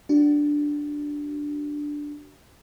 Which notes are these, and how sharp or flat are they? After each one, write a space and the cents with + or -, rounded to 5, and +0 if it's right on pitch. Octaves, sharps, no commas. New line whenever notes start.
D4 +0 F#4 +35